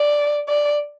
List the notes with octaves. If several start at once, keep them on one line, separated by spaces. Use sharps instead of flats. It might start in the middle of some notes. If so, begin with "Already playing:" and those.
Already playing: D5
D5